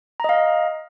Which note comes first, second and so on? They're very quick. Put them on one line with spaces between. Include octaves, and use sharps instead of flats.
A#5 D#5 F5